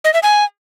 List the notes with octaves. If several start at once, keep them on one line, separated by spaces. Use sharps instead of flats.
D#5
E5
G#5